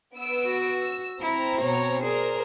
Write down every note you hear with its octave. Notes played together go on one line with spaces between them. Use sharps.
B3 E6 D7
F#4
E6
C4 E4 A#5
B2 C#5
G#4 A#4 C5 D5